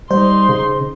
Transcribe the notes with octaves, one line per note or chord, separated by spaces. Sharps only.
G3 D#4 C5 C6
C#3